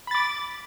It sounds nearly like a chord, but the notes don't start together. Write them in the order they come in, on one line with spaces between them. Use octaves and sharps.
B5 A6 D6